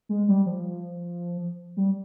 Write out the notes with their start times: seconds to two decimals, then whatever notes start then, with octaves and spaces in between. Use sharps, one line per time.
0.09 G#3
0.28 G3
0.46 F3
1.77 G3